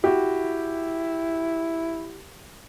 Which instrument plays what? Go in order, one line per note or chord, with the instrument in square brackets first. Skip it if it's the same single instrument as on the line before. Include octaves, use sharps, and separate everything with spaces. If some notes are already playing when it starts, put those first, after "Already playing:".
[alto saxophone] E4 [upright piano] F#4 G4